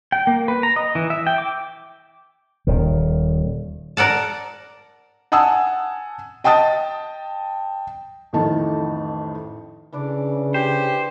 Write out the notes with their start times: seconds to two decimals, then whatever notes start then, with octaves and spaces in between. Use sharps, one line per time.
0.12 G5
0.27 A#3
0.48 B4
0.63 A#5
0.76 D#5
0.95 E3
1.10 E5
1.27 G5
1.38 D6
2.67 D#1 D#3
3.97 A#4 D5 F#5 A5
5.32 F#5 G#5 A5 D#6 E6
6.44 D#5 G5 A5 D#6 A6
8.33 A1 F2 A2 D#3 A5
9.92 C#3 E3 D4 D5
10.54 G4 C5